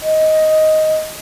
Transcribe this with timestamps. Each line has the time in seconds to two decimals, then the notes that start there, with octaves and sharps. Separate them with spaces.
0.02 D#5